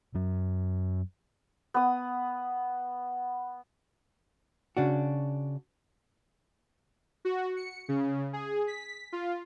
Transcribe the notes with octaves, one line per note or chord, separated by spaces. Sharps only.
F#2 F#3
B3 D#6
C#3 D4 F#4
F#4
C#7
C#3
G#4
B6
F4